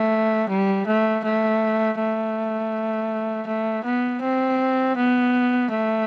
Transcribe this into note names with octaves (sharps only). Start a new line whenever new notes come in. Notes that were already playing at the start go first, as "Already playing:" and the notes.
Already playing: A3
G3
A3
A3
A3
A3
B3
C4
B3
A3